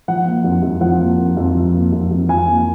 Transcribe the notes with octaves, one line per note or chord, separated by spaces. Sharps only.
F3 F#5
A#3
F2
F2
F3 F#5
A#3
F2
F2
F3
A#3
F2
F2
F3 G#5
A#3